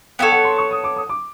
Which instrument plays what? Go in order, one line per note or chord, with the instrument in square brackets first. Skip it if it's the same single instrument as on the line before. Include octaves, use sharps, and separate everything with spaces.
[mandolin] B3 E4 A4 C#5 [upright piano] G5
[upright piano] F#5
C6
C#6
D#6
D6
D#6
D6